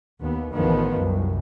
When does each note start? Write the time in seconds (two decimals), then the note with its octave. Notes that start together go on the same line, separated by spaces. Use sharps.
0.19 D#2 B3
0.52 A1 E2 D#3 F3 B3
0.95 C2 F#2